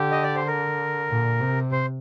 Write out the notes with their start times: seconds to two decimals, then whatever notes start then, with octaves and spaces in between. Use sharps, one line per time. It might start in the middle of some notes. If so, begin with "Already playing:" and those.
Already playing: D3 G4
0.11 D#5
0.23 D5
0.35 C5
0.47 A#4
1.10 A#2
1.40 C3
1.72 C5